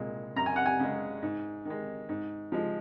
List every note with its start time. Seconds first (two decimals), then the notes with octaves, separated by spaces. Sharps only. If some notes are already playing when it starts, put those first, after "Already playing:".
Already playing: C2 A#2 G#3
0.36 F#2 A#5
0.46 G#5
0.56 F#5
0.66 G#5
0.79 C#3 G#3
1.22 G#2
1.65 D#3 G#3
2.09 G#2
2.52 F3 G#3